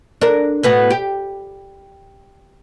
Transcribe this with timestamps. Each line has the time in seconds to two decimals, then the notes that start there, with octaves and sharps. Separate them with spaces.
0.21 D4 A#4
0.63 A2 B3 F#4
0.90 G4